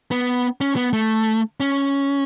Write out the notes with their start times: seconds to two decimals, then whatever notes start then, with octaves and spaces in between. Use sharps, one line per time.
0.11 B3
0.61 C#4
0.76 B3
0.93 A3
1.60 C#4